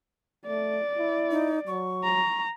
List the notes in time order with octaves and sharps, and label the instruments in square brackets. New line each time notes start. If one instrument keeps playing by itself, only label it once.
[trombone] A3 [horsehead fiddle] D5
[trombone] E4
[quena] D#4
[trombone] F#3 [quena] C#6
[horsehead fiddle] A#5